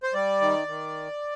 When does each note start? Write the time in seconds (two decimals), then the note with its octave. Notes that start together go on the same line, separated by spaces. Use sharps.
0.03 C5
0.14 G3 D5
0.41 D#3
0.68 D#3